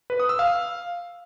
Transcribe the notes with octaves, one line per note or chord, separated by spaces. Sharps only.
B4
D#6
E6
F5